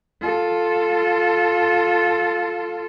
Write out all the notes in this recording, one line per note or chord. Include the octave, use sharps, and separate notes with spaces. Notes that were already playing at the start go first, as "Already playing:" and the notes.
F4 A4